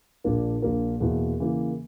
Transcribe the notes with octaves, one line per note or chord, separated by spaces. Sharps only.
A#1 A#2 A#3 D4 A#4
A#1 A#2 A#3 D4 A#4
E2 B2 A#3 E4
C#3 E3 A#3